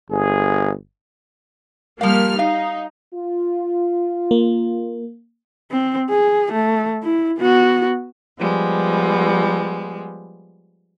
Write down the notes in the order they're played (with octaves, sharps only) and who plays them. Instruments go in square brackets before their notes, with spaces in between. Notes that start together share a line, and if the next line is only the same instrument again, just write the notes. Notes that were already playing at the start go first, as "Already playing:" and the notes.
[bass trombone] G1 [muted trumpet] G#4
[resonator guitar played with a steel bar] F3 F5 [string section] G3 A#3 F6
[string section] D#4 [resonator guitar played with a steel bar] F5
[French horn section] F4
[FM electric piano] A#3
[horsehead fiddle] C4
G#4
A3
E4
B3 F#4
[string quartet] F3 G3 G#3 B3